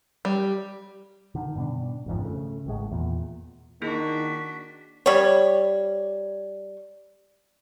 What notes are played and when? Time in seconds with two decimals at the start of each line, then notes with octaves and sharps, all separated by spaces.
0.25 G3
1.35 D3 D#3
1.56 G2 B2 D4
2.06 G#1 F2 G#2 F3
2.21 C#3 A3
2.66 G#1 A2 G#3
2.91 E2 A#2
3.82 D#3 A#3 D4 E4 F#4 G#4 B6
5.06 G3 C#5